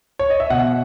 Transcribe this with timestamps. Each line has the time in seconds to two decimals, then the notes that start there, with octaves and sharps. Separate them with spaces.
0.19 C#5
0.30 D#5
0.40 E5
0.50 B2 F#5